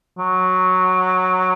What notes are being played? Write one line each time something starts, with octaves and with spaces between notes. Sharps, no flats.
F#3